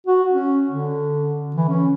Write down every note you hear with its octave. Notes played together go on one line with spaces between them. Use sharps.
F#4
C#4
D3
E3
C#4